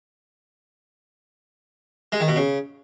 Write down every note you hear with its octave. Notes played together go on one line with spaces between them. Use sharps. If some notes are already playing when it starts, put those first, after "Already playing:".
G#3
D#3
B2
C#3